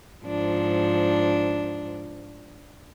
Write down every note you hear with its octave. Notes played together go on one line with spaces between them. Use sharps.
G#2 F3 D4